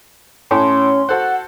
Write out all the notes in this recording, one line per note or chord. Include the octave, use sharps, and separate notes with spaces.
A2 A3 C#4 E4 C6
F#4 A4 C5 F#5